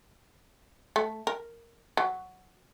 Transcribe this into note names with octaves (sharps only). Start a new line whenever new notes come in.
A3
A#4
F#3